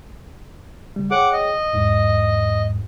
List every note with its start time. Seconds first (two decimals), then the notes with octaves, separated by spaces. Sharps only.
0.96 C#3 G3
1.11 G#4 C#5 F#5 G5 D6
1.33 D#5
1.73 E2 G#2